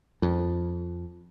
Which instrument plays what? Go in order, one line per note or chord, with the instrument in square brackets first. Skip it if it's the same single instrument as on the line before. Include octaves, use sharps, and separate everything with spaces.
[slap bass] F2